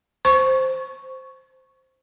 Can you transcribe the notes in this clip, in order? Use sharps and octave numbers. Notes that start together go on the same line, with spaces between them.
C5 C#6